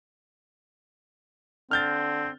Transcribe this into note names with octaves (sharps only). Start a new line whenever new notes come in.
D3 C4 F6 G6 A6